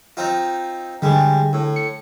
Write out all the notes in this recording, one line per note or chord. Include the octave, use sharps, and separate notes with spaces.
C4 D#4 F4
D3 G3 G#3
A2
C#7